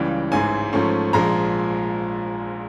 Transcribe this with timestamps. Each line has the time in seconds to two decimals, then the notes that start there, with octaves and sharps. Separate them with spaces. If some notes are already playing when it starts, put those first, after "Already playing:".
Already playing: C#2 C#3 E3 G3 G5
0.31 A1 G#2 E3 G#3 G#5
0.73 G#2 F3 A3 C#4
1.13 A#1 A#2 F3 G#3 A#5